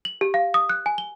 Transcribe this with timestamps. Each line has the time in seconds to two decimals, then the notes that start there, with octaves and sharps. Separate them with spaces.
0.05 F#7
0.21 G4
0.34 F5
0.54 D#6
0.69 F#6
0.86 G#5
0.98 G7